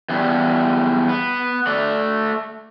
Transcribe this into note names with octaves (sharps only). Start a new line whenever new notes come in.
E2 G3
B3
A3 D5